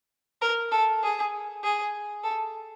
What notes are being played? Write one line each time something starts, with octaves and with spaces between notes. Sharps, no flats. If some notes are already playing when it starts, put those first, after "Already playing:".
A#4
A4
G#4
G#4
A4